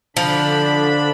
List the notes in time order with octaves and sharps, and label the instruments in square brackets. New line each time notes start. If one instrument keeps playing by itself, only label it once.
[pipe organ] D3 D4 B5 [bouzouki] F3